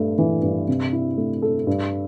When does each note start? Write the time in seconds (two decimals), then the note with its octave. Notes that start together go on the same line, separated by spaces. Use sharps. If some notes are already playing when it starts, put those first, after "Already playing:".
Already playing: G2 A3
0.18 E3
0.43 G2
0.68 C3
0.93 E4
1.17 A3
1.42 A4
1.67 G2